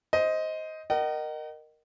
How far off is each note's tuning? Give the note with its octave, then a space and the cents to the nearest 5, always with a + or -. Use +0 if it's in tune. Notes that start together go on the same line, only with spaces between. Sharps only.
C5 +0 D#5 +15
A#4 +0 D#5 -20 F#5 +45